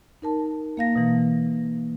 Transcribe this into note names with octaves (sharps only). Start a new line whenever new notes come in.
D#4 A#4 A5
A#3 F5 A#6
B2 E3